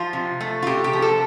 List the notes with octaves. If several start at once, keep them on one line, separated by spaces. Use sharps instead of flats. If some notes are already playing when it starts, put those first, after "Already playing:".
Already playing: F3 F4
C3
A3
F4
C3 G4
G4
F3
A4